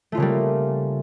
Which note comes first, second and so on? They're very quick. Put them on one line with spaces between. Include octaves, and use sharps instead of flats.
A3 F4 C#3 A#3 G3